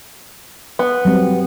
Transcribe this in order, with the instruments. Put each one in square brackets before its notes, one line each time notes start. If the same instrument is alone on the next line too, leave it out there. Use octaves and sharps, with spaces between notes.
[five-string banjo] B3
[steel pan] F#3 G3 C4